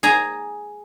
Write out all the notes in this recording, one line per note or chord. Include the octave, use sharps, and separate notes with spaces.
G#4 G#5 A#5